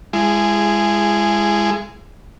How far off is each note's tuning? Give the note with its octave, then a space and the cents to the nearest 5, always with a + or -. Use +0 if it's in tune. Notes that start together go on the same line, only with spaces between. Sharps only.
G#3 -10 E4 +35 G#4 +0